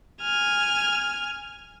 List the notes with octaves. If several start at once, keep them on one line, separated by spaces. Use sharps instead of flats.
G#5 F6